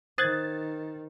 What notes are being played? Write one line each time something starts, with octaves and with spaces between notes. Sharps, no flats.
D#3 C5 D#6 F#6 G#6 A6